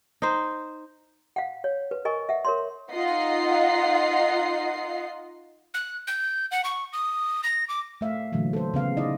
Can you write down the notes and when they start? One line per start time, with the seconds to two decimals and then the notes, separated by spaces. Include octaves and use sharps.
0.22 D#4 C5
1.36 F5 F#5
1.64 C#5
1.91 B4
2.05 A#4 D#5 G#5 C#6
2.29 E5 F#5
2.45 A#4 C#5 C6
2.92 D#4 F4 D#5 F#5 C7
5.74 F#6
6.07 G6
6.51 F#5
6.64 C#6
6.93 D#6
7.44 A#6
7.68 D6
8.01 A3 E5 F5
8.33 A#2 D3 E3 F#3 A3
8.53 A4 C5
8.74 C#3 B3 F5
8.97 D#4 E4 D5 D#5